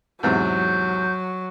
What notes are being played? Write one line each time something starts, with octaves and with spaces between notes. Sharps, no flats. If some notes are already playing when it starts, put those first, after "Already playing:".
E2 G#2 C3 F#3 G6